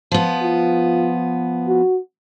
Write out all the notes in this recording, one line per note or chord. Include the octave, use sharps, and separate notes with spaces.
F3 B3
F4
F#4